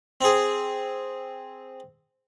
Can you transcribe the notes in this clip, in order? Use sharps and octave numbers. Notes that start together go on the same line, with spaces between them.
C4 G#4